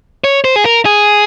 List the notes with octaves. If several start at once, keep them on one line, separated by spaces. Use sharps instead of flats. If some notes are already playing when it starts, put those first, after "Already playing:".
C#5
C5
G#4
A#4
G#4